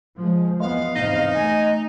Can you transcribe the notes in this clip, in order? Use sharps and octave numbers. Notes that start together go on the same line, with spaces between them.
F3 G#3
E2 G#3 B3 F5
E2 G#2 C3 D#4 D#5
A3 G#5